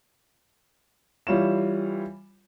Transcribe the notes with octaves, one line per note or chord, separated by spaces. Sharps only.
E3 G3 F4 C#5 E7